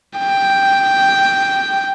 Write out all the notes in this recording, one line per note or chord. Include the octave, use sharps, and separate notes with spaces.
G5